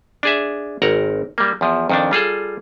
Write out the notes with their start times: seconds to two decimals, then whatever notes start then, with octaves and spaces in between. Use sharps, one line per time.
0.23 D4 G#4 E5
0.82 G#1 A#4 F#5 A#5
1.38 G3 A#3
1.61 E2 F3
1.90 F2 D#3 D4
2.11 G3 F4 G#4 A4